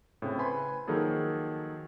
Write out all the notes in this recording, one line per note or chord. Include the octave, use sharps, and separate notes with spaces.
A2 C#3 C4 E4
B4 G#5 B5 C6
D#3 F3 F#3 A#3 G#4 A4